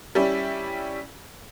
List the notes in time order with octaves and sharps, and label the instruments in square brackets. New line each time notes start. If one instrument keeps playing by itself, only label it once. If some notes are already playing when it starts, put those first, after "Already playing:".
[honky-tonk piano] G3 C#4 E4 G4